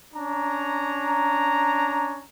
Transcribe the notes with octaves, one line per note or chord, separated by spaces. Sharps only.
C#4 D4 A#5